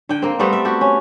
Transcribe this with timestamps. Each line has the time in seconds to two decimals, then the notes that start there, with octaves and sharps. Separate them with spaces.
0.09 D3 G5
0.22 A#3 C4
0.39 G3 A3 B3 C4
0.53 E5
0.65 F#4 G4 A4
0.81 C#4